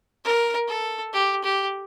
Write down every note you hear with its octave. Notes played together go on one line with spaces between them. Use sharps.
A#4
A4
G4
G4